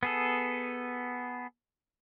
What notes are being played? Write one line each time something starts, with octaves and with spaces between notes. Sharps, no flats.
B3 G#4 A4